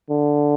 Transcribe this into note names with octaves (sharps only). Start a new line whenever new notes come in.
D3